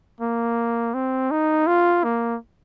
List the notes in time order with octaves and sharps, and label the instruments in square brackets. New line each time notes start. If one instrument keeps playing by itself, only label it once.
[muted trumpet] A#3
C4
D#4
F4
A#3